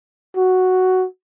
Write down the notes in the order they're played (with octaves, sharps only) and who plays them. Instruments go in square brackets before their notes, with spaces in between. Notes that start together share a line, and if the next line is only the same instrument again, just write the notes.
[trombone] F#4